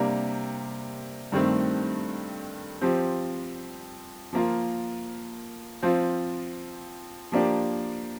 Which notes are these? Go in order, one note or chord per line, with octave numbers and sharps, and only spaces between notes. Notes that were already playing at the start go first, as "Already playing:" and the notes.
Already playing: C3 G3 A#3 D4
G2 D#3 A3 C4
F3 C4 G4
F3 A#3 F4
F3 C4 F4
F3 A#3 D4 G4